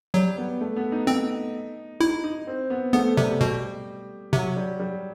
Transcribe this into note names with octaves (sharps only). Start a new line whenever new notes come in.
F#3 G3
B3
A3
B3
D#4
C4
D#4 E4
D#4
C4
B3
A3 B3
C3 G3
B2 G3
C3 F#3
G3
G3